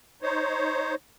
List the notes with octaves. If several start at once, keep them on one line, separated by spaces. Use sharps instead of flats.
D#4 C5 C#5